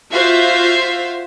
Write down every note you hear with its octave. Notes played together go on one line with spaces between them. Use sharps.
F4 F#4 C5 E5 F5